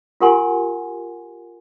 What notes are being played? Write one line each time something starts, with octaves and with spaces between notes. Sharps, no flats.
F4 G4 A#4 F#5 G#5 C6